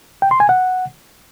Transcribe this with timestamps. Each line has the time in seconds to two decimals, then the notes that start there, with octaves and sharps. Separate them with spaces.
0.22 G5
0.31 C6
0.40 G#5
0.49 F#5